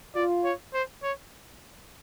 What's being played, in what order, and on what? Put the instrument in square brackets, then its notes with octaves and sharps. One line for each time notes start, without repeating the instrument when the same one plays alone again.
[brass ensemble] F4 [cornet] D5
[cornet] C#5
C5
C#5